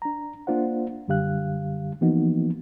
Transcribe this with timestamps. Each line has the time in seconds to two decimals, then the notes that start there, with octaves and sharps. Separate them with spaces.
0.02 D4 A#5
0.47 A#3 D4 F4 C5 F#5
1.08 F#2 D3 G3 G4 F5 F#6
2.01 E3 F3 A#3 B3 D#4 F#4